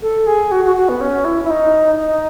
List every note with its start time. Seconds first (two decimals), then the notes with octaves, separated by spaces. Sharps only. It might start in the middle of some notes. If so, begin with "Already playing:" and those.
0.02 A4
0.27 G#4
0.51 F#4
0.65 F#4
0.76 F#4
0.89 B3
1.01 C#4
1.25 E4
1.44 E4
1.50 D#4
1.99 D#4